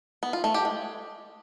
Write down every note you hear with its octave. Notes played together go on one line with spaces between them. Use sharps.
B3
F4
A3
G4
G#3